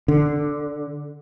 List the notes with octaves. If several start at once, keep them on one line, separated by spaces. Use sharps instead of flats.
D3